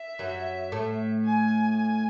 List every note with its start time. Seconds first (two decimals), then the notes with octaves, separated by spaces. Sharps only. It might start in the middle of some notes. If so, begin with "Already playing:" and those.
Already playing: E5
0.19 F#2 F#3
0.72 A2 A3
1.25 G#5
1.76 G#5